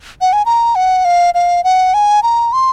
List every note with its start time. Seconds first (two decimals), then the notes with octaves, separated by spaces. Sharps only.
0.21 F#5
0.33 G#5
0.46 A#5
0.75 F#5
1.05 F5
1.34 F5
1.64 F#5
1.94 G#5
2.23 A#5
2.53 C6